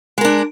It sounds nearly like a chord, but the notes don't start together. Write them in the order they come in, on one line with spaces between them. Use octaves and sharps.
G#3 A#4 D4